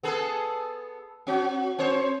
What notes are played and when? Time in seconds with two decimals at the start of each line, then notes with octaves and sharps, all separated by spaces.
0.03 B3 G#4 A4
1.27 C4 F#4
1.78 C4 C5 C#5